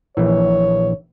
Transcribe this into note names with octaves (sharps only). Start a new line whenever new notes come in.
A#1 E3 C#5